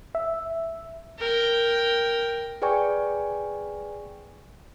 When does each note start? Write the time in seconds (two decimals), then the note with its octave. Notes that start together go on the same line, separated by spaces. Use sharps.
0.15 E5
1.19 A#4 G5
2.62 G#4 B4 D5 G5 G#5 C#6